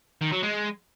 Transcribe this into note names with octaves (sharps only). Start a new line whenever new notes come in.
D#3
F#3
G#3